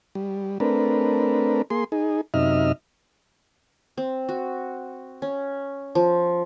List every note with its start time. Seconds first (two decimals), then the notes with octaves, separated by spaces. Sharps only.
0.15 G3
0.60 A3 C4 D4 A#4 B4
1.70 A#3 G#4 C6
1.92 D#4 G#4
2.34 F#2 C3 D#4 D#5 E5 F6
3.97 C4
4.29 F#4
5.22 C#4
5.95 F3